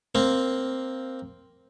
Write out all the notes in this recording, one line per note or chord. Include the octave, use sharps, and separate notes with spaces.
A#3 C4